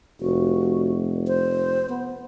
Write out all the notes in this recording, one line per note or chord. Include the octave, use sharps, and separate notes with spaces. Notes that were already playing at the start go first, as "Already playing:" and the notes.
F1 F#4
C5
B3